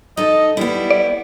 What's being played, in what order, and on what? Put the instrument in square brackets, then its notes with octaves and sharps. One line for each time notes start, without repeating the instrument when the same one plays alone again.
[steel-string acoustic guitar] D#4 A4 [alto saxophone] D#5
[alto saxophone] G3 [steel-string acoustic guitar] B3 E4
[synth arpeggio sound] D5